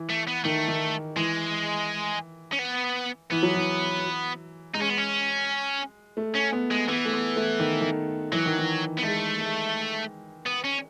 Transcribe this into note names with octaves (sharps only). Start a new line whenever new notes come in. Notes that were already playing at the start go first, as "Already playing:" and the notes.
Already playing: E3
A3
B3
D#3 A3
D#3
E3 G#3
C#4
B3
E3 B3
F#3
E3
G#3 D#4
C#4
B3
C#4
A3
C#4
B3
G#3
E3 B3
A3
B3
A3
D#3
D#3
E3 F#3
D#3
E3
B3
G#3 A3
G#3
B3
C#4